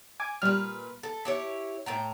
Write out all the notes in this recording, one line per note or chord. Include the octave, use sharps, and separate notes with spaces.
G#5 D6
A#2 G3 B4 F6
A4
E4 G4 C#5
A2 G5 A#5